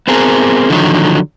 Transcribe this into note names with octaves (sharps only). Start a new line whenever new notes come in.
B3 C4 G#4 A#4
D3 D#3 F3 F#3